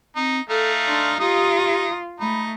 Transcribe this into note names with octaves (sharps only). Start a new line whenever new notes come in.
C4 D#4
A3 D#4 A4 F5
D4 C6
D#4 F4 G4 D#6
A3 D#4 B5